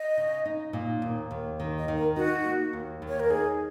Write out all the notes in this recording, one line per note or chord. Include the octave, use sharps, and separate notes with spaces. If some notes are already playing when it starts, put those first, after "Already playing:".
Already playing: D#5
C#3
D#4
A#2
D#2
D#2
D#3
D#5
D#3
A#4
D#4 F#4
A#3
D#2
D#2
C#5
A#4
D#4 G#4